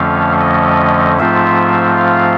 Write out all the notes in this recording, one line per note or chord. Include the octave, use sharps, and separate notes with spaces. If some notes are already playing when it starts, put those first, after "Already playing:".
Already playing: F2 D3 F3 A3 C#4 F5
D#5
G#2 F3 A3 C4 F4 E5
F5